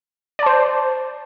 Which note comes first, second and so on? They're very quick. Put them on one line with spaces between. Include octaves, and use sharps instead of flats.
D5 A5 C5